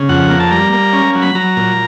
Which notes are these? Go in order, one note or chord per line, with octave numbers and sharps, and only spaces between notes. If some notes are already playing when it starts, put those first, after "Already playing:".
Already playing: C#3
F2 F#5
A#3
A5
G3 A#5
A#3
C#4
F#3
B5
F#3 A#5
A#2